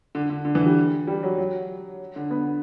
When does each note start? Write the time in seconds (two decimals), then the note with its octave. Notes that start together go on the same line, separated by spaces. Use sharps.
0.15 D3
0.30 D3
0.45 D3
0.55 E3
0.66 G3
1.08 G3
1.23 F#3
1.38 F#3
2.16 D3
2.31 B3